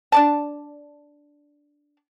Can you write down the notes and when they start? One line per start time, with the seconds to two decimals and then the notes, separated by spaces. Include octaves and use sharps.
0.12 D4 D5 A5